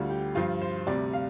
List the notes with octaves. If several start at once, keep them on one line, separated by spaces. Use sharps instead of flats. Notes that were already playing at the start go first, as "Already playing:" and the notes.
Already playing: D2 D3 G3 F4
G4
G2 F3 F4
C5
D2 C3 G3 D5
F5